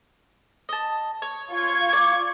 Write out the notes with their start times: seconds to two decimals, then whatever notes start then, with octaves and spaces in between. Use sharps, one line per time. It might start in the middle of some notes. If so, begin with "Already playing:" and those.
0.69 D#5 A5
1.22 C#5
1.52 F4 C#6 G#6
1.93 D5